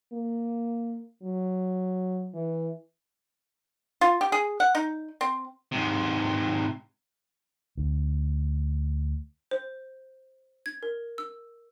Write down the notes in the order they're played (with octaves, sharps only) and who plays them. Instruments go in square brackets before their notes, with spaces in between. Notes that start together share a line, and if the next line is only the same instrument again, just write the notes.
[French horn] A#3
F#3
E3
[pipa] F4
G4
G#4
F#5
D#4
C4
[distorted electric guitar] G#2 C3
[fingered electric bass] D2
[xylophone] C5
G#6
A#4
E6